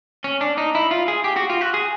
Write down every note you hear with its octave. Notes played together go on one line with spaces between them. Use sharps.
C#4
D4
D#4
E4
F4
G#4
G4
F#4
F4
F#4
G#4